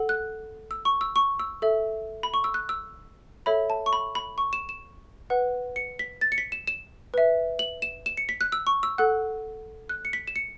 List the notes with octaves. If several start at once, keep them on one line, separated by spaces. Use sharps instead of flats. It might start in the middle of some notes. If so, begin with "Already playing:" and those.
Already playing: A4 F#5
F#6
E6
C#6
E6
C#6
E6
A4 E5
B5
C#6
E6
F#6
E6
A4 C#5 E5 B5
A5
C#6
B5
B5
C#6
E7
E7
B4 F#5
C#7
B6
A6
C#7
B6
E7
E7
B4 E5
F#7
E7
E7
C#7
B6
F#6
E6
C#6
E6
A4 F#5 F#6
F#6
C#7
B6
E7
C#7